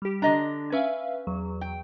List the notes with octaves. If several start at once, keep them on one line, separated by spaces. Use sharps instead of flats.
G3 G4
D3 D4 D#5 A#5
C#4 B4 E5 F5
E2 F#3
G5